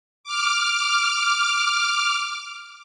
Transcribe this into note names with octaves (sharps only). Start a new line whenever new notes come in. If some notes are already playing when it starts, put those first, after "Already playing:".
D6 F6